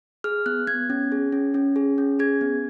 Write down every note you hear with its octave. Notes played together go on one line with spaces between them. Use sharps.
G#4 F6
B3 F#6
B3 G#6
C#4
G#4
C#4
C#4
G#4
C#4
G#4 G#6
B3